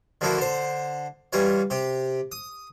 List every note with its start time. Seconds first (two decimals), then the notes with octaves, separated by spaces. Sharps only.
0.21 D3 F3 A3 A#3 E4 F#4
0.38 D3 C5
1.33 E3 G3 F4 C#5
1.70 C3 G4
2.32 D#6